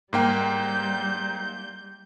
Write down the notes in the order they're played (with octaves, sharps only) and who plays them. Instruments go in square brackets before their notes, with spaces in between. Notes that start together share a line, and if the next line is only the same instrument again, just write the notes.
[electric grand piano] G#2 A#3 G5 [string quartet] G3 G6